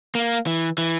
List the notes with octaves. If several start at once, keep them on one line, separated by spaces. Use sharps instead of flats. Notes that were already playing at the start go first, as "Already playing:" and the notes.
A#3
E3
E3